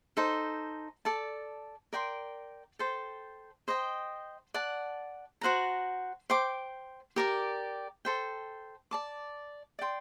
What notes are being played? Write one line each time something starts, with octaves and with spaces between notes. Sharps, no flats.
D#4 A4 C5
A4 D5 A5
A#4 D5 G5 C6
A4 C5 G5
C5 D#5 G5
D5 F#5 A5
F#4 C5 F#5 A#5
C5 G5 D6
G4 A#4 D5
A4 C5 G5
D5 A5 D6
D5 G5 C6